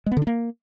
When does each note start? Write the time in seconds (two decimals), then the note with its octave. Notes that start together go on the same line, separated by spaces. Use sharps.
0.06 G#3
0.12 B3
0.17 D3
0.22 D4
0.27 A#3